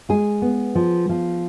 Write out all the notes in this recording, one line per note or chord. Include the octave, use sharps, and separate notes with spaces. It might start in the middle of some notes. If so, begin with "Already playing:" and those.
G#3 G#4
B3
F3
F3